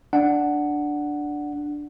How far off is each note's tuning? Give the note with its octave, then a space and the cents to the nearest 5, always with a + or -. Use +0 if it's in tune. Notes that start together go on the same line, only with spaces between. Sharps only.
D4 +0 F#5 +0